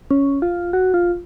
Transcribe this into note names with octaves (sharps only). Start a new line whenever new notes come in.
C#4
F4
F#4
F4